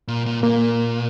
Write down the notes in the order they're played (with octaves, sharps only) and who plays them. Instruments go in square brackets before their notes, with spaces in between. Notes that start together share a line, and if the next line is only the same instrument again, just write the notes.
[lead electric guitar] A#2
A#2
[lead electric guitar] A#2 [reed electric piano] A#3